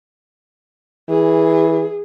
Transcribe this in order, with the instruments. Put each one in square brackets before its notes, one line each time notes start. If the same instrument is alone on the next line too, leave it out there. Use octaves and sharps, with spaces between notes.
[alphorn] E3 [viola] G#4